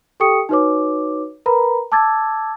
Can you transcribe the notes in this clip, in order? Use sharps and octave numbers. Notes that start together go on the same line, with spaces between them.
G4 A4 G5 C#6 D#6 C#7
D#4 F#4 B4 C#5 D6
A#4 B4 A#5 B5
A5 D6 E6 G#6 A6